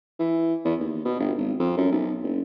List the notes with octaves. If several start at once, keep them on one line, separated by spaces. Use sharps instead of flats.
E3
E2
D#2
B2
G1
G#1
F2
F#2
B1
F#1